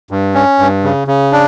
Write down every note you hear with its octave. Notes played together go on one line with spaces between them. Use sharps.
G2
C#4
G2
C#3
C#3
D4